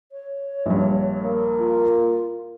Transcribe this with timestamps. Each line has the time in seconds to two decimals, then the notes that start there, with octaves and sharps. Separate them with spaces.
0.12 C#5
0.66 A#1 G2
1.23 A#3
1.59 F4